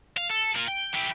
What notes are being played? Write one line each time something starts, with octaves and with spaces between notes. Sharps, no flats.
F5
A4
F4 A#4
G5
E4 G4